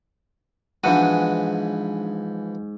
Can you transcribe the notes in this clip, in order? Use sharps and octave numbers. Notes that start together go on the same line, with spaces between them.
G#2 E3 F3 B3 D4 F#4 E5 D#7